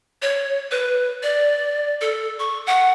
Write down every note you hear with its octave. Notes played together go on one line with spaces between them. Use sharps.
C#5
B4
D5
A4
C#6
F#5